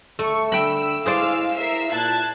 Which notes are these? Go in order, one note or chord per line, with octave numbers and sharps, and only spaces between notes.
D2 A3 C#6
D3 E5 G5 B5 E6
G#3 E4 G#4 C5 D5 F5 E6
A#4 E5 C7
A#2 A5 F#6 G#6